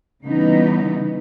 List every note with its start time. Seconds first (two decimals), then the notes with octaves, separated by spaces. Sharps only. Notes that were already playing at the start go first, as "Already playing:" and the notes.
0.24 C#3 E3 G3 B3 D#4